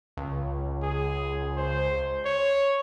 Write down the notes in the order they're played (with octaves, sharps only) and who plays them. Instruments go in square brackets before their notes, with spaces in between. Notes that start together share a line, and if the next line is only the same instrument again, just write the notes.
[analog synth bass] C#2
[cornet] G#4
C5
C#5